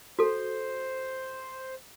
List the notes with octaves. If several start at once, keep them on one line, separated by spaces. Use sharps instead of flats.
F#4 A4 C5